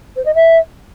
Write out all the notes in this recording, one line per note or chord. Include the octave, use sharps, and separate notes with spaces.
C5
D#5
E5